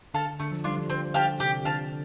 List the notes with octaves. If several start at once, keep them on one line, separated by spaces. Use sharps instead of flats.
D3 A4 F5 A5
D3 A3
F3
G3 D4 F4
F3
D3 C4
D3 G4 F5 A5
C3 G4
D3 F5 A5